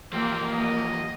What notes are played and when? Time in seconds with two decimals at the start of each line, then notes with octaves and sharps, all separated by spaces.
0.13 E3 F3 A#3 C4 G4
0.52 D#5